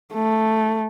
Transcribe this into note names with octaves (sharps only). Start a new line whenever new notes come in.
A3